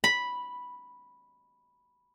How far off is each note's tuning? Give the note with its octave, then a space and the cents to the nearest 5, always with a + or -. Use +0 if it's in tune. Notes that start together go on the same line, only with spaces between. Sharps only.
B5 -5